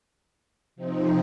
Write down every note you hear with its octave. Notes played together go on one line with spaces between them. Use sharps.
C3 F3 C4 D#4